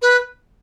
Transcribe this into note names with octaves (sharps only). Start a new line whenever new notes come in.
B4